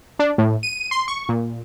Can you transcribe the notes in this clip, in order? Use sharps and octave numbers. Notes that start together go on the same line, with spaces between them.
D4
A2
D#7
C6
C#6
A#2